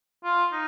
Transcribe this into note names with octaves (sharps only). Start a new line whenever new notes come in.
F4
D#4